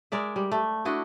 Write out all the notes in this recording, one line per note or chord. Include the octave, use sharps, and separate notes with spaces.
G#3 A#4 D5 E5
G3
A3
D4 E4 F#4 D#5